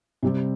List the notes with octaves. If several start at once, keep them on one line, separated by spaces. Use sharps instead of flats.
C3 G3 C4 G4